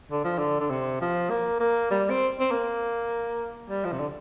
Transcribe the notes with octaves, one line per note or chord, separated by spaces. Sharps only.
D3
F3
D3
D3
C3
F3
A#3
A#3
G3
C4
C4
A#3
G3
F3
C3
D3